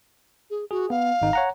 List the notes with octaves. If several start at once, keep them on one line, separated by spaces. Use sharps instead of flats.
G#4
F#4 G#4
B3 F5
G#1 D#4
C#5 F#5 A#5